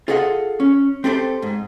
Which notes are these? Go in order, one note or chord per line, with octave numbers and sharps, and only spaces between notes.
F4 G#4 A4 D#5 F#5
C#4
C4 G4 A4 C5
G#2